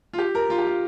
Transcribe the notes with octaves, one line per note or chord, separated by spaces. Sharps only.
F4
G4
A#4
F4
G4
F4